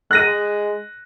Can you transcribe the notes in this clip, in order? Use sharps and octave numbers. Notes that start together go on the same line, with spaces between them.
G#3 F#6 A#6 D#7